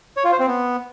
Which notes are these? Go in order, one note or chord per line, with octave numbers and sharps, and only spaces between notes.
C#5
F4
C5
C4
B3